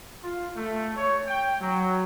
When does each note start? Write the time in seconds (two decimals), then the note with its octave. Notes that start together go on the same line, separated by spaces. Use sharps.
0.22 F4
0.56 A3
0.96 C#5
1.27 G5
1.60 F#3